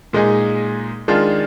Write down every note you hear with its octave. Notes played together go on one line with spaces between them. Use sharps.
A#2 G#3 D#4 G#4
D#3 G#3 D4 F4 G#4